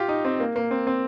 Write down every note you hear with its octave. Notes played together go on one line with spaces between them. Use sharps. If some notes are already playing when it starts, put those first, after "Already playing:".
Already playing: F4 G4
D#4
C4
A#3
A#3
C4
C4